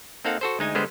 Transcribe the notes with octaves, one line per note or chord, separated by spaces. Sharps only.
A#3 C4 D#4 A4 F5 F#5
F#4 A4 C5
D2 G#3 D#4 G#5
D3 G3 G#3 B3 B4 C5